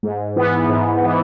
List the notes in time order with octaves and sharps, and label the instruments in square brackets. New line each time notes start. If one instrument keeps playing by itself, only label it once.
[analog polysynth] G#2
E3 B3
G#2
E3 B3